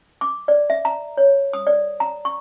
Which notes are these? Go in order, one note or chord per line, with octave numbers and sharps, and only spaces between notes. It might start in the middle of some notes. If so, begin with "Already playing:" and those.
D6
D5
E5
A#5
C#5
D#6
D5
A#5
C#6